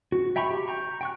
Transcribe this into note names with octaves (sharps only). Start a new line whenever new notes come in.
F#4
E5 G5 A#5 B5 C#6
G4
G5 A#5 C#6
G5 C#6 F#6